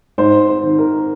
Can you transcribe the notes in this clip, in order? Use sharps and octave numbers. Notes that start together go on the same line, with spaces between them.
G#2 C5
C5
D#3
A#4